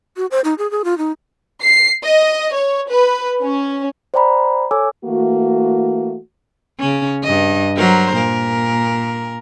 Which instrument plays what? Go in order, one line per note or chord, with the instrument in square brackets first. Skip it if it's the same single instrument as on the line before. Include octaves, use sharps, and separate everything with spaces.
[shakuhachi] F#4
C5
D#4
G#4
G#4
F4
D#4
[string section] C7
D#5
C#5
B4
C#4
[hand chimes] C5 D5 G5 A#5 B5
A4 C#5 G#5 D6 E6
[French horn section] E3 A3 A#3 F#4
[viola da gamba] C#3 C#4
G2 D#5
F#3 A#4 C5
A#2 A#4